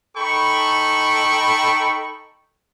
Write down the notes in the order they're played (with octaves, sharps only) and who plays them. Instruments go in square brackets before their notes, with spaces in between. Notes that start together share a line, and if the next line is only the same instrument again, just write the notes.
[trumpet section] D#4 A4 G5 B5 C#6